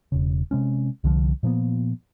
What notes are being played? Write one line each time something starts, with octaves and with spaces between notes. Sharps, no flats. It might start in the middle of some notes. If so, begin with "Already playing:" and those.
E1 C#3
C3 G#3 C#4
C2 D3 F3
A#2 F3 A#3 B3